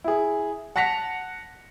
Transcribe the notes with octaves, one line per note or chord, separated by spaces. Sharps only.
E4 G#4
F#5 A5 A#6 B6 C#7 F7